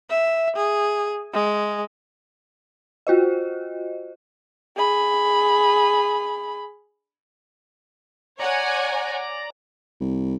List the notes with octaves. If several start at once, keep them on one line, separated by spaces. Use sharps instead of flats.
E5
G#4
G#3
F4 F#4 C5 D#5
G#4 B5
C#5 D5 F#5 G#5 A#5
C2